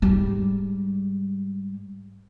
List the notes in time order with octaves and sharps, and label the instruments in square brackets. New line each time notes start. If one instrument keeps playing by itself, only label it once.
[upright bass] G#2 G3